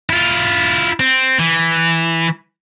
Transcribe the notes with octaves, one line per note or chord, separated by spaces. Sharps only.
E4 F4
C4
E3